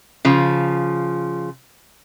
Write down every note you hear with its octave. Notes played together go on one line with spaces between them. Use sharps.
C#3 F3 F4